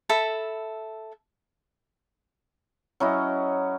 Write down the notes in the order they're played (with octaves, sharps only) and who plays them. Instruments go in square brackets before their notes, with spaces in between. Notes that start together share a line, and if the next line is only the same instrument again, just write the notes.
[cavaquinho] A4 E5 B5
[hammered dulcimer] F#3 C#4 E4 D#5